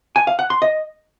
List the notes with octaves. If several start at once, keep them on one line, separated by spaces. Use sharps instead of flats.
G#5
F5
F#5
C6
D#5